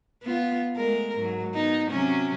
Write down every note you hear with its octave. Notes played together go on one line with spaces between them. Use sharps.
B3 F4
G#3 A3 A#4
G#2 F#3
B3 D#4
C3 F#3 C#4